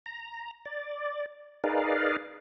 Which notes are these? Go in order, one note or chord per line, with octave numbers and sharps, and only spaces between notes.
A#5
D5
D#4 G#4 A#4 B4 D5 F5